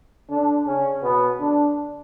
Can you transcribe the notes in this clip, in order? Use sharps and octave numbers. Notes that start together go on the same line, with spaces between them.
D3 D4
C#3 C#4
B2 B3
D3 D4